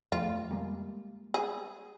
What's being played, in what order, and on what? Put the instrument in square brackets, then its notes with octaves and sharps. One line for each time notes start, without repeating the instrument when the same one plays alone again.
[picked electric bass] F2 F3 A3 [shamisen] F4
[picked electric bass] G3 G#3 A#3
[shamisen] G#4